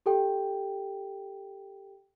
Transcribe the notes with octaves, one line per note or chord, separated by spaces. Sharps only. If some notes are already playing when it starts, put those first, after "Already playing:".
G4 A4 G5